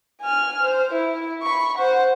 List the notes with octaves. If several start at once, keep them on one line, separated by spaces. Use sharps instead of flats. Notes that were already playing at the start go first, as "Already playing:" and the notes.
G#5 F6
C5
E4
B5 C#6
C5 F#5